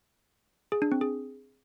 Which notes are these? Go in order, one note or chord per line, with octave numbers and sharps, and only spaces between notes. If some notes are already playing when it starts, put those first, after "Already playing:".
G#4
D4
C4
G#4